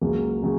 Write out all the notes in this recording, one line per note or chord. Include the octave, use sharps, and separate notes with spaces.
C#2 C#3 F#3 A#3
C#3 F#3